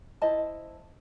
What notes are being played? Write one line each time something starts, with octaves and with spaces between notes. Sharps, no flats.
E4 C5 D#5 A5